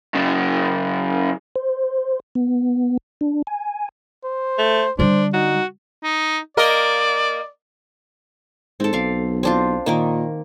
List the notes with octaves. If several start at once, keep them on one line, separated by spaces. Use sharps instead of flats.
F#2 C#3
C5
B3
D4
G#5
C5
A3
D3 G3 D4 C5
D#4 F#4
D#4
A#3 A#4 D5 D#5
G#2 C4 A4
B1 D5 F5
C4 D4 F4
A#2 D#3 A#3 A#4